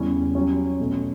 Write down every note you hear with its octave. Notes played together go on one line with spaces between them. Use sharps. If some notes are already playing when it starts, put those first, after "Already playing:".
Already playing: E2 C#3 G3 C#4 E4
F#3 C#4 G4 C#5
B2 A3 C#4